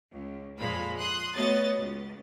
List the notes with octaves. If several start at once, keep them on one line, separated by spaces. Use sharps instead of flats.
C#2
F2 A#2 G#3 C5 F5 B5
C6 D#6 F#6
A3 B3 F#4 C#5 D#5 A6
C#2